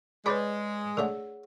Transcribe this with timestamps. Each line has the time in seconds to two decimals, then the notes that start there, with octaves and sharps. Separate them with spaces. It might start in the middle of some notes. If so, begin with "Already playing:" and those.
0.26 G#3 G#4 B4 C#5 D5 B5 D6
0.97 D3 A3 G#4 C#5 F#5